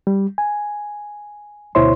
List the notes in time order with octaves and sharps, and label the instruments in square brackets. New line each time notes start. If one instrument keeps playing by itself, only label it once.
[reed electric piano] G3
G#5
D2 B2 E4 C5 C#5 C6